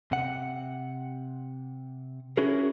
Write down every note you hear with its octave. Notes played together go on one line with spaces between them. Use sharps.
C3 F#5
C#4 D4 E4 F#4 G#4 A#4